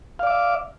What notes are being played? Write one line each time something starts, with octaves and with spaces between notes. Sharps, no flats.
D5 E5 F5 D6